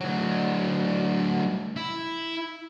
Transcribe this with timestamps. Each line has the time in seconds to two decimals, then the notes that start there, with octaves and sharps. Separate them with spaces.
0.01 D2 F#3
1.76 E4